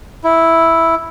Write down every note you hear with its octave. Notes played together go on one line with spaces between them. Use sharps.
E4